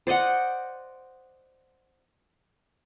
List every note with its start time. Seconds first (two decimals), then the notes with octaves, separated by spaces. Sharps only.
0.07 C5 D5 D#5 F#5